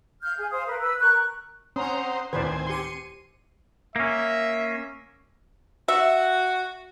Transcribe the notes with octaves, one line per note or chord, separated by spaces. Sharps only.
F5 F6 G6
G#4
C5 F5 D#6
A#4 B4
B4 E6
A#4 C#6 F#6
C4 C#4 C5 F#5 A#5 D#6
D2 A2 D#3 C4 B4 C5 D5 G#5
G4 C6 C7 C#7 D#7
A#3 C#4 E5
F#4 E5